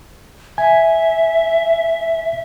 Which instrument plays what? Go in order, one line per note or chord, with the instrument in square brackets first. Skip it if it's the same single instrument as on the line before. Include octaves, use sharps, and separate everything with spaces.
[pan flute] E5 [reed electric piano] G#5